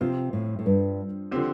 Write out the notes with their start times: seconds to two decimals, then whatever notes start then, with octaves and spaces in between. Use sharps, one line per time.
0.01 C3 F3 C4 F4
0.33 A2
0.59 A2
0.66 G2
1.31 D3 F3 C4 G4